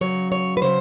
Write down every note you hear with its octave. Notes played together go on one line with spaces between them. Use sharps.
C#3 F#3 C#5
C#5
B4
C#3 F#3 C5